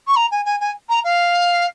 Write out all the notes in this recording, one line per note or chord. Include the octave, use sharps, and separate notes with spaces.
C#6
A#5
G#5
G#5
G#5
A#5
F5